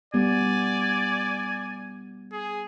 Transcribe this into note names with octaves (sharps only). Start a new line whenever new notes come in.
G3 B3 D5 G#5
G#4